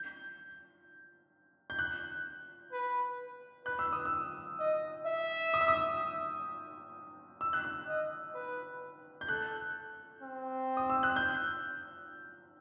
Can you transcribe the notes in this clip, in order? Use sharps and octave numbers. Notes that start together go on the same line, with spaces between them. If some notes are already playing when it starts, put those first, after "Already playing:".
Already playing: G6
G6
F#6
B4
B4 F#6
E6
D#6
E6
D#5
E5
D#6
E6
D#6
E6
F#6
E6
D#5
B4
G6
A4 F#6
C4
D#6
E6
F#6
G6